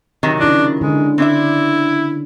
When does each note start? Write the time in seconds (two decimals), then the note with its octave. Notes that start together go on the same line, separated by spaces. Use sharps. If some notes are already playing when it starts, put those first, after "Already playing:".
0.23 C3 D#3 F#3
0.39 C#3 D4 E4
0.81 D3 G#3
1.18 C4 D4 E4 E5